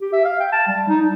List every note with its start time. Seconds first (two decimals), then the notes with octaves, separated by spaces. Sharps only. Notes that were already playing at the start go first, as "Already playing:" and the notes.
0.01 G4
0.13 E5
0.25 F5
0.40 G5
0.52 A5
0.67 G3
0.88 D#4
1.01 G3